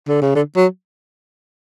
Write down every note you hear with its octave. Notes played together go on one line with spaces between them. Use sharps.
D3
C#3
D3
F#3